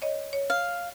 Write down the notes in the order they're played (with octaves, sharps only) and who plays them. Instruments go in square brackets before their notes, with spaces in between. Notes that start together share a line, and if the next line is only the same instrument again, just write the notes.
[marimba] C#5 D#5
C#5
[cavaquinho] F5